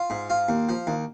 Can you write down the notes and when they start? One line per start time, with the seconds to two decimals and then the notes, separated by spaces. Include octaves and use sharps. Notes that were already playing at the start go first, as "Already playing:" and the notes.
Already playing: F4
0.10 G#2
0.30 F4
0.49 D#2
0.69 F3
0.87 D#2